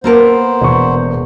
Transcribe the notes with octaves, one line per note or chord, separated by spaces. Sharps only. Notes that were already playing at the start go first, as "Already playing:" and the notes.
A#3 B3 A4 A#4 C5
E1 C#6